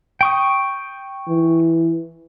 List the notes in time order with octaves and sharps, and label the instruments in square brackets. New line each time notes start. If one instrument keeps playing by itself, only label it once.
[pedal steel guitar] G5 C#6 D#6
[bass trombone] E3